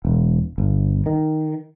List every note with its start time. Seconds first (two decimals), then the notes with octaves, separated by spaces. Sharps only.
0.05 E1
0.58 G1
1.06 D#3